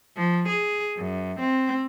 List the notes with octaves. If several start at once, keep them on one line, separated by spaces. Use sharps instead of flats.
F3
G#4
F#2
C4